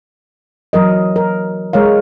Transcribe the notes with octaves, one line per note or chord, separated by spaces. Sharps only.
E3 F#3 A#4 D#5
A#4
G#3 A#4 C#5 F5